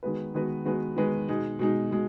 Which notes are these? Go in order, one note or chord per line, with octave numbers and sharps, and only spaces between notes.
D#3 G#3 B3 F#4 B4
D#3 G#3 B3 F#4 B4
D#3 G#3 B3 F#4 B4
D#3 G#3 B3 F#4 B4
B2 G#3 D#4
B2 G#3 D#4
B2 G#3